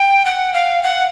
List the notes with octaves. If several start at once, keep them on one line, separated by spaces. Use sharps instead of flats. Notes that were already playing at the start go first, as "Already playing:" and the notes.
Already playing: G5
F#5
F5
F#5